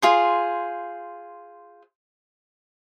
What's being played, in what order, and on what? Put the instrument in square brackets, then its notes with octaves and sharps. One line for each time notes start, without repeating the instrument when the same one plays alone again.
[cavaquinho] F4 G#4 C5